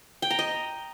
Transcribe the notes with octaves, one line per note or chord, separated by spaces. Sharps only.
G5
A#5
D#5